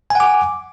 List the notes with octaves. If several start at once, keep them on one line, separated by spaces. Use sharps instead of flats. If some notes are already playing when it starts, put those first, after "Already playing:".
F#5 G#5 D6